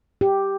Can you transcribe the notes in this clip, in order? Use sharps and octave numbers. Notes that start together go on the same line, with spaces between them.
G4